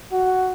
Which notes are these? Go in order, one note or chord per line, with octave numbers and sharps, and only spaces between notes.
F#4